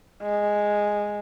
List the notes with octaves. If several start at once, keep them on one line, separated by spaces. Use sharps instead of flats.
G#3